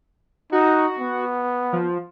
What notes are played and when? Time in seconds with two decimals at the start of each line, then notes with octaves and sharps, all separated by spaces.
0.52 D#4 F#4
0.99 B3
1.73 F3